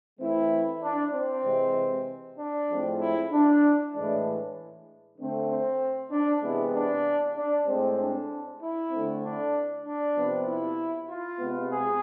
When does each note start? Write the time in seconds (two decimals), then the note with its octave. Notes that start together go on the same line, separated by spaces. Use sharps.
0.19 E3 A3 C4 E4
0.82 D4
1.12 C4
1.44 C3 E3 G#3
2.37 D4
2.69 A2 F3 G#3 C4
2.99 E4
3.31 D4
3.93 A2 E3 G#3 D4
5.17 D3 A3 C4
5.48 C4
6.10 D4
6.41 C3 E3 G#3 B3 E4
6.73 D4
7.35 D4
7.66 A2 G#3 C4
7.98 D4
8.60 E4
8.91 D3 A3 C4
9.23 D4
9.84 D4
10.16 C3 F3 B3
10.46 E4
11.08 F4
11.39 C3 G#3 B3
11.71 G#4